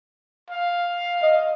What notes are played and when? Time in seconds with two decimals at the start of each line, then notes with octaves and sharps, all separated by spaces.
0.50 F5
1.23 D#5